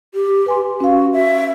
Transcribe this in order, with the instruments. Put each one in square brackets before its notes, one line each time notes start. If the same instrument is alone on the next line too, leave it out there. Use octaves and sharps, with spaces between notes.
[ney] G4
[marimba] B4 G#5 C6
[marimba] C#4 F5 [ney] F#4
[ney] E5